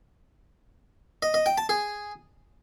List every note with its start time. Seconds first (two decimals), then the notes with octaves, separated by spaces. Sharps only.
1.22 D#5
1.34 D#5
1.46 G5
1.58 A5
1.69 G#4